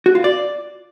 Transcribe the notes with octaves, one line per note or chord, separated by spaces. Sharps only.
F#4
F4
D5